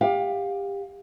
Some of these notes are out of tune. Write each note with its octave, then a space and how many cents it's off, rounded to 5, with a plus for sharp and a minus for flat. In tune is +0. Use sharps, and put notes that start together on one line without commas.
G4 +25 F5 +30